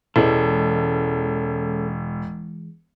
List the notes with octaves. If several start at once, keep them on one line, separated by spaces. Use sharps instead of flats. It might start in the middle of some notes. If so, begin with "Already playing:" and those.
E1 E3 G#3 C#4 A4